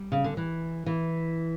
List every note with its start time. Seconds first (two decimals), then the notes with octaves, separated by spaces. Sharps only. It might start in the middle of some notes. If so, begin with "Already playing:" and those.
Already playing: G3
0.12 C#3
0.24 D3
0.37 E3
0.86 E3